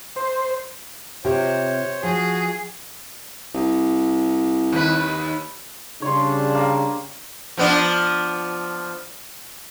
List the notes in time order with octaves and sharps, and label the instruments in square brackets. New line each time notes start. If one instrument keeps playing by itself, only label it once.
[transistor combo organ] C5
[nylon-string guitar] C3 F4 G4 [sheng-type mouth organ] C5 C#5
[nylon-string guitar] F3 [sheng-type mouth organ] F#4 [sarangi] G#4
[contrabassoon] C2
[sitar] D#2 B4
[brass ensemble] C#3 G3 D4 [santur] C#5 C6
[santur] A#3
[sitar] F3 B3 D4